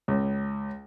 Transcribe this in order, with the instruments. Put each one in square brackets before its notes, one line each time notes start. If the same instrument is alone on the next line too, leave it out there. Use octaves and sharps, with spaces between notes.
[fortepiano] C#2